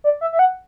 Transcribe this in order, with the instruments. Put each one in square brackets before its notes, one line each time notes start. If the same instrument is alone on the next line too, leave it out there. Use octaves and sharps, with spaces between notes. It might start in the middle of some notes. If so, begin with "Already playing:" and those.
[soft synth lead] D5
E5
E5
F#5